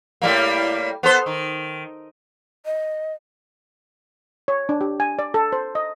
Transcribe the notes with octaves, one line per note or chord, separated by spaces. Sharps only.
A2 G3 A#3
B3 A4 C5
D#3
D#5
C#5
D4
G4
G#5
D5
A4
C5
D#5